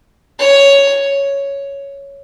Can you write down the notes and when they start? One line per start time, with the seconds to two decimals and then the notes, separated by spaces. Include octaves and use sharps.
0.39 C#5